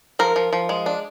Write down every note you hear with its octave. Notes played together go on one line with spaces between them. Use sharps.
F3 A#4
F3
F3
G#3
D4